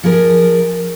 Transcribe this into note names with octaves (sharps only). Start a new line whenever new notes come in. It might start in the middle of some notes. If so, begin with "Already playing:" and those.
F3 G#4 A#4